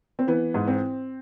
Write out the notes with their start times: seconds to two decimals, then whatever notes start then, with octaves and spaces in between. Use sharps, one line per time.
0.19 C4
0.27 E3 B3
0.54 G#2
0.67 C4